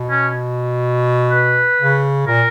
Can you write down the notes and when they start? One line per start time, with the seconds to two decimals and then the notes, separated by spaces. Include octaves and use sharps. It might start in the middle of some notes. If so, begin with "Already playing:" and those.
Already playing: B2
0.10 C#4
1.31 B4
1.80 C#3
2.27 A#2 A#4